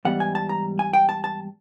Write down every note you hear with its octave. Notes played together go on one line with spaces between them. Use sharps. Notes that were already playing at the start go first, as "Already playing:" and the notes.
G#2 E3 G3 B3 F#5
G#5
A5
A#5
G#5
G5
A5
A5